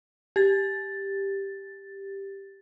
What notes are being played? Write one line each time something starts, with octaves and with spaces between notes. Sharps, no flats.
G4 A6